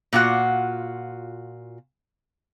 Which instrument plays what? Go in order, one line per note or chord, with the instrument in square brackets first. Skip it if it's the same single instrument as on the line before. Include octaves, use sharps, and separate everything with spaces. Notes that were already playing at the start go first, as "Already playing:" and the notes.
[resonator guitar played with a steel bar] A#2 F4 F#4 F#5